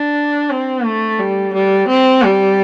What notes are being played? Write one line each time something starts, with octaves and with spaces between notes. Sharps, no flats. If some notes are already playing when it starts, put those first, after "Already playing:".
Already playing: D4
C4
A3
G3
G3
C4
G3